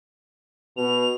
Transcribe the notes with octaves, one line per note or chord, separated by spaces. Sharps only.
B2 F7